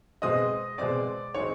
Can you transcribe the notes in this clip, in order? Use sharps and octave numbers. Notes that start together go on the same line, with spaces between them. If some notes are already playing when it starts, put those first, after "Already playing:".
B2 G#3 C4 D#5 D#6
B2 G#3 C4 D5 D6
D#3 G#3 C4 D#4 C#5 C#6